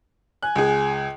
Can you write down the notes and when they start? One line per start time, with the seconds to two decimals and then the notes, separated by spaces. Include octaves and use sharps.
0.43 G#5 F#6
0.56 C#2 G#4